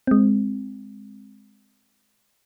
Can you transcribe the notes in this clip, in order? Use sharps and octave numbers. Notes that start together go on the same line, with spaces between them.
G#3 C4